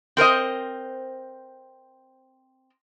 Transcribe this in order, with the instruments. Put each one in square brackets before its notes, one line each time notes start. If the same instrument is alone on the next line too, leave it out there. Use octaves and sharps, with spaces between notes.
[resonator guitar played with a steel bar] C4 A#4 C5 D#5